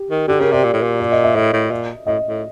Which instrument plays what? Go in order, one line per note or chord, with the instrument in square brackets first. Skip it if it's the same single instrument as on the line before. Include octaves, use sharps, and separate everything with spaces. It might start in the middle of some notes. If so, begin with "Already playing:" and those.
Already playing: [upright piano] G4
[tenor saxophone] D#3
[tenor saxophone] D3 [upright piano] G4
[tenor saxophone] C#3 [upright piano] A#4
[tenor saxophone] C3 [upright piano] D5
[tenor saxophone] A#2
A2
A#2
[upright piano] D5
D#5
E5
[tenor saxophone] A2 [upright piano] D#5
[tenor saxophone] A2
A#2
[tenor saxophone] A2 [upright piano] D#5
[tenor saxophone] A2